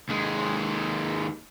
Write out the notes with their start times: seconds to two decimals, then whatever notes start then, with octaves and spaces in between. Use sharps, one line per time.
0.09 D#2 G#3